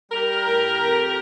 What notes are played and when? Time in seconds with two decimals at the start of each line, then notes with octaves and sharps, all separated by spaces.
0.12 G3 G4 A#4
0.45 A2
0.77 F2